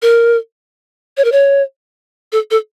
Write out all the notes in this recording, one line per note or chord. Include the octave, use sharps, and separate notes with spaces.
A#4
C#5
A#4
C#5
A4
A4